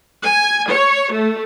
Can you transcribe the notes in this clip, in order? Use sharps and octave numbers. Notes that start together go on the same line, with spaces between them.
G#5
C#5
A3